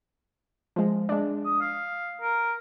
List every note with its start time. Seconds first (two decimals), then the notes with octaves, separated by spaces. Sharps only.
0.76 F3 G#3
1.09 G#3 D4
1.45 D#6
1.61 F5
2.21 A#4